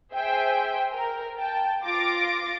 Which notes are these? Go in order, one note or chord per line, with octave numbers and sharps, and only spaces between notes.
G#4 C5 E5 G5 G#5
A#4
G5 A5
F4 D6 A6 A#6 D7